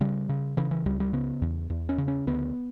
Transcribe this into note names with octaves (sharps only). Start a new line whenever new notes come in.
C#3 G3
C#3
C#3 E3
E3
C#2 G3
G3
C#3 B3
E2
E2
C#4
C#3
C#4
D2 B3